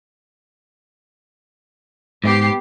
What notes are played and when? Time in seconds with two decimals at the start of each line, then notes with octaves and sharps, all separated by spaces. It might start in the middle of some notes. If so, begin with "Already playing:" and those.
2.24 G#2 B3 G4 C7